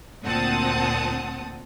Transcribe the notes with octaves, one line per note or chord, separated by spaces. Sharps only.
D2 A#2 C4 F#5 A5 D#6